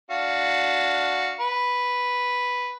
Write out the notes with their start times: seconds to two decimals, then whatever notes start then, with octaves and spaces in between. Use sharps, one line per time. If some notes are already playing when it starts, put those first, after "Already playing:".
0.11 D4 F#4 F5
1.40 B4